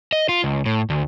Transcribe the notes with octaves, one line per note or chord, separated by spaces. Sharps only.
D#5
F4
C#2
A2
D2